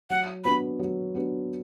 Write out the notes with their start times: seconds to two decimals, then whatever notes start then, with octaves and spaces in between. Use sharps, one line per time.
0.10 F#3 F#5
0.44 B3 D4 F#4 B4 B5
0.79 F#3
1.15 B3 D4 F#4 B4